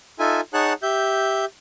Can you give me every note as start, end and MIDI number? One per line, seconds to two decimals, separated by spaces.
0.19 0.41 63
0.19 0.41 65
0.19 0.41 69
0.19 0.41 76
0.19 0.41 80
0.54 0.73 63
0.54 0.73 68
0.54 0.73 73
0.54 0.73 78
0.54 0.73 81
0.54 0.73 90
0.83 1.45 67
0.83 1.45 76
0.83 1.45 91